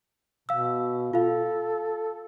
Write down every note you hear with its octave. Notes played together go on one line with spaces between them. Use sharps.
B2 F5 E6
F4 A4 F5